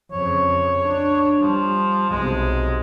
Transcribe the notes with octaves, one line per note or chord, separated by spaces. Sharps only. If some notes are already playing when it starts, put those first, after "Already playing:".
F2 C#3 C#5
D4
F3 G3
B1 C3 G#3